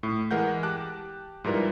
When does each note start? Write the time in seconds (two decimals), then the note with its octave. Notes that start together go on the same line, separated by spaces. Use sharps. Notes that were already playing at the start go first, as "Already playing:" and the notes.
0.03 A2
0.31 E3 G#3 A#4 F#5 G6
0.63 G4 A5 D6 F#6
1.44 G#2 F3 G3 E4 A#4 B4